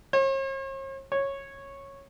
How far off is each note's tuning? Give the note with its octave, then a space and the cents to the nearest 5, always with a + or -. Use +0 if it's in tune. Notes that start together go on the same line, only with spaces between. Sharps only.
C#5 -45
C#5 -10